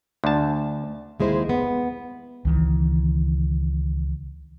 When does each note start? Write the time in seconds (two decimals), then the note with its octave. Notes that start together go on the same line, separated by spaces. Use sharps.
0.24 D2 A5
1.20 D#2 G#3 E4 C5
1.49 B3
2.45 C#2 D#3 E3